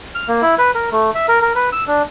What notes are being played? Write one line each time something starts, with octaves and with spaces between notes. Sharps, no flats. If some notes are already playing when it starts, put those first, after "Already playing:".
F6
A#3
E4
B4
A#4
A3
E5
A#4
A#4
B4
E6
D4